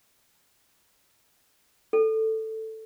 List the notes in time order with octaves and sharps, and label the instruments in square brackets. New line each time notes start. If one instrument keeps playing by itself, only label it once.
[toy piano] A4